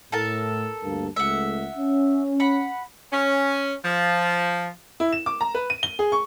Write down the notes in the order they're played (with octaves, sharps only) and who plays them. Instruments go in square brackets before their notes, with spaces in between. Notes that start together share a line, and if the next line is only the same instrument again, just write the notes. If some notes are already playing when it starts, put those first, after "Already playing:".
[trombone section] A2 [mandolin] A4 A#4 A5
[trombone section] D2 G2 A#3
[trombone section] C#2 G#3 A3 [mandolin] E5 F#5
[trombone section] C#4
[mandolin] F#5 B5
[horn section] C#4
F3
[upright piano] E4
E7
D6
A#5
B4
D#7
G7
G#4
C#6